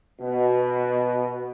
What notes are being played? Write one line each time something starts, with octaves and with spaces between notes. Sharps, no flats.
B2